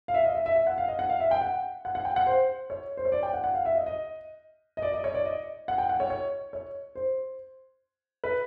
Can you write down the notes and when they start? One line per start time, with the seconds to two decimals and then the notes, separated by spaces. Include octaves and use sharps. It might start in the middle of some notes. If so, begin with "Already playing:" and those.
0.08 F5
0.14 E5
0.25 D#5
0.35 E5
0.46 E5
0.56 E5
0.67 F#5
0.78 F5
0.88 D#5
0.99 F#5
1.09 F5
1.20 E5
1.31 G5
1.42 F#5
1.85 F#5
1.95 F#5
2.05 G5
2.16 F#5
2.27 C5
2.70 C#5
2.97 C5
3.05 C#5
3.12 D5
3.23 G5
3.34 F#5
3.44 F#5
3.55 F5
3.65 E5
3.76 D#5
3.86 D#5
4.77 D#5
4.82 D5
4.93 D#5
5.04 C#5
5.15 D5
5.25 D#5
5.68 F#5
5.78 G5
5.89 F#5
6.00 C#5
6.10 C#5
6.53 C#5
6.95 C5
8.24 B4